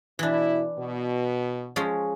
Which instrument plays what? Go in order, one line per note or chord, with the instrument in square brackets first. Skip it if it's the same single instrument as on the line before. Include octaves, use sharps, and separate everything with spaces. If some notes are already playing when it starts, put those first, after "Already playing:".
[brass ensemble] B2 E4 [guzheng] E3 D4
[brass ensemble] B2
[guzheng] F3 G#3 C#4